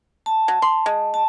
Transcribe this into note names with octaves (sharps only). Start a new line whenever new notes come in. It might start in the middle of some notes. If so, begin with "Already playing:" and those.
A5
F#3
C6
G#3
A5